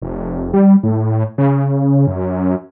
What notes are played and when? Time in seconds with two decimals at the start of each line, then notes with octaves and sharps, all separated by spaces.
0.02 F1
0.53 G3
0.83 A2
1.38 C#3
2.07 F#2